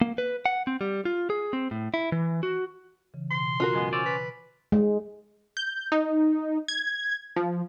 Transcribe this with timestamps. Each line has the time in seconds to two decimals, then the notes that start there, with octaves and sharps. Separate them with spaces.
0.01 A#3
0.18 B4
0.46 F#5
0.67 C4
0.81 G3
1.05 F4
1.30 G#4
1.53 C4
1.71 A2
1.94 E4
2.12 E3
2.43 F#4
3.14 C#3 E3
3.30 B2 C6
3.60 F4 F#4 A#4
3.73 F#2 G#3 B3
3.93 C#4 C5 D5 E6
4.06 B4
4.72 G#3
5.57 G6
5.92 D#4
6.68 G#6
7.36 F3